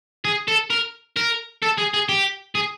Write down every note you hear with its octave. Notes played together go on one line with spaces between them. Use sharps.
G#4
A4
A#4
A#4
A4
G#4
G#4
G4
G#4